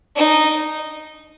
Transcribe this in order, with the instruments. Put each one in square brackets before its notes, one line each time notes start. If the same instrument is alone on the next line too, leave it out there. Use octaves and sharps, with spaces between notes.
[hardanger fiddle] D#4